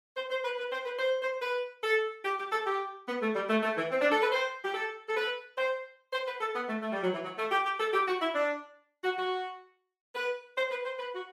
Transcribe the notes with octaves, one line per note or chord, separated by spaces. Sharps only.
C5
C5
B4
B4
C5
B4
C5
C5
B4
A4
G4
G4
A4
G4
B3
A3
G3
A3
A3
E3
C4
D4
A4
B4
C5
G4
A4
A4
B4
C5
C5
B4
A4
B3
A3
A3
G3
F#3
E3
F#3
A3
G4
G4
A4
G4
F#4
E4
D4
F#4
F#4
B4
C5
B4
C5
B4
F#4